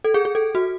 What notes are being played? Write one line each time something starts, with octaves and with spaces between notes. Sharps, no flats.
A4
G#4
G#4
A4
F#4